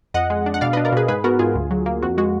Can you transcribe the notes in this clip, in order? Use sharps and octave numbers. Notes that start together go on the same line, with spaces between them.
F2 D#5 F#5
G#3
D4
F#5
B2 D5 F5
D4 B4 D#5
A#4 D5
B2 G#4 B4
G#2 G#4 B4
B3 F#4 A#4
G#2 F4 G#4
D2
F#3
A#3
F2 F#4
G#3 F#4